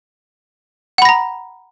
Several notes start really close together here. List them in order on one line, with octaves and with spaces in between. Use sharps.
F#5 B5 A#6 A#5